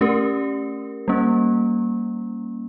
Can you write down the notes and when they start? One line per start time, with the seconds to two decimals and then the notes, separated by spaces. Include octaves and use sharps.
0.01 A3 C#4 G4 A#4
1.08 G3 A#3 C#4